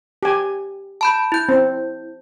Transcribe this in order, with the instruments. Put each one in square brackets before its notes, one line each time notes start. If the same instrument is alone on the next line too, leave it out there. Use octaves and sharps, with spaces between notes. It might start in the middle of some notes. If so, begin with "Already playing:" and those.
[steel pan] G4 G#5
[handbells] A5 B5 G6
E4 G6
[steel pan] C4